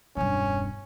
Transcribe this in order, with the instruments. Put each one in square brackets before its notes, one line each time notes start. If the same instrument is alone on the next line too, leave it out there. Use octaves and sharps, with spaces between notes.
[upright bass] E1 G2 [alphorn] C#4